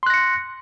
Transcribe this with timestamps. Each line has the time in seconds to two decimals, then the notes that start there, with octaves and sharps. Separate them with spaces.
0.03 C6
0.06 F#6
0.10 A#6
0.14 C#7